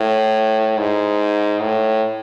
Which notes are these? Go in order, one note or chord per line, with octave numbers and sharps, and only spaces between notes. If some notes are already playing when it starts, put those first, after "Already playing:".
Already playing: A2
G#2
A2